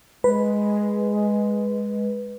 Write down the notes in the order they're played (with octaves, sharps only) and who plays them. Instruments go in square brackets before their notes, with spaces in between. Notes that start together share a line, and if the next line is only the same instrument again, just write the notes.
[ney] G#3 [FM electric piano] B4